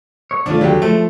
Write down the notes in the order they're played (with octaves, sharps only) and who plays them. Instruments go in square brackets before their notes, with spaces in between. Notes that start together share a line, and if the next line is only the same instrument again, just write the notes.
[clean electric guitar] C#5
[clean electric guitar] C2 D#3 A3 [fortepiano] D4 F4
[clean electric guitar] D#2 D3 [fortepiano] F#3 G3 G4
[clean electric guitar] F3 [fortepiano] A3